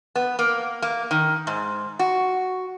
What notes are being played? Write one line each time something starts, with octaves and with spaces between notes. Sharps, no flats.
B3
A#3
A#3
D#3
G#2
F#4